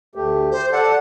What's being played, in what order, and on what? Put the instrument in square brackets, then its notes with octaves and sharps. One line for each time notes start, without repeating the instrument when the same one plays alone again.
[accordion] D2 A3 G4
[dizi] C5
[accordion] A4 D5 A5 [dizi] F#5